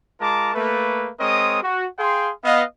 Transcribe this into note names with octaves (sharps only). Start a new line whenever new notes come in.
G#3 F4 A#4 A5 A#5 D6
A3 A#3 B4
G#3 C4 A#4 C#5 D#5 D#6
F#4
G#4 F5 G5 C6
B3 D#5 F5